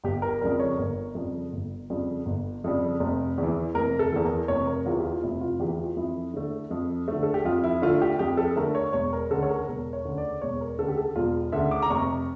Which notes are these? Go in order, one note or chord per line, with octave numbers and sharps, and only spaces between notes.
G1 G4
A#4
F2 C#3 G3 A#4
C#5
G1 A#4
F2 C#3 G3
G1
F2 C#3 G3
G1
F2 C#3 G3
F1
E2 E3
F1 A#4
A4
E2 E3
A#4
F1 C#5
A#4
E2 E3 F4
G4
F4
F1 E4
F4
E2 E3 G4
F4
F2 E4
D3 A3
F2
D3 A3
A4
G4
F2 F4
E4
D3 A3 F4
G4
F2 G4
A4
D3 A3 A#4
C#5
E1 C#5
A#4
D2 C#3 A4
C#5
A#4
E1 A#4
C#5
D2 C#3
D5
E1 C#5
C#5
A#4
D2 C#3 A4
G4
A4
E1 F4
D2 C#3 E5
D6
A#5
F1 C#6